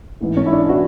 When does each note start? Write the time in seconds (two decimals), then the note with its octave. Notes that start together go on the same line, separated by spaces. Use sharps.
0.21 A1 G#2 E3
0.37 C#4
0.46 E4
0.53 D4
0.69 E3 F#4